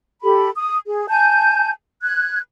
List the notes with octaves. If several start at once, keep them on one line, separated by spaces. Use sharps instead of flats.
G4 A4 B5
D#6
G#4
G#5 A5 G6
F#6 G#6